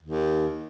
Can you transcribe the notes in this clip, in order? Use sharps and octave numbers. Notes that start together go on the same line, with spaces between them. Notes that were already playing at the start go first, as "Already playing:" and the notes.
D#2